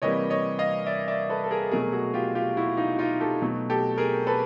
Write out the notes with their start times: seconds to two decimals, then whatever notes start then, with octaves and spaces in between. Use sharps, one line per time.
0.02 C3 E3 G3 A#3 C#5 D#5
0.30 C#5 D#5
0.59 D#5 F5
0.86 D5 E5
1.08 D5 E5
1.29 A4 B4
1.44 A4
1.51 G#4 A#4
1.71 B2 F#3 A3 G#4 A#4
1.92 F#4 G#4
2.14 F4 G4
2.35 F4 G4
2.57 E4 F#4
2.77 D#4 F4
2.99 D#4 F4
3.20 G4 A4
3.42 B2 F#3 A3
3.70 G4 A4
3.98 G#4 A#4
4.27 A4 B4